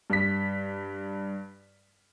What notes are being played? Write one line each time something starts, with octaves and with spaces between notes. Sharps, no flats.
G2 B6